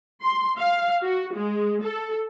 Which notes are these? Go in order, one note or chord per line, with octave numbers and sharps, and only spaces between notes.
C6
F5
F#4
G#3
A4